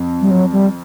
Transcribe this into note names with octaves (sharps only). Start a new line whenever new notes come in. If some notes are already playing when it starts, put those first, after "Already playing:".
Already playing: F2 F3
G3
F#3
G3